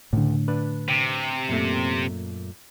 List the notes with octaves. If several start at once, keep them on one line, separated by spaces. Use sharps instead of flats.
C#2 A2 D3
D4 B4
C3
F#2 A#2 A3